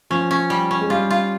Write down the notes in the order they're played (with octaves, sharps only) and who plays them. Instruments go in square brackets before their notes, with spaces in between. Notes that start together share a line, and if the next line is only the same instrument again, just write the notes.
[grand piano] F3 [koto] C#4
[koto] C#4
G3
C#4
[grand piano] G#3
[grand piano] G3 [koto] F4
[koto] F4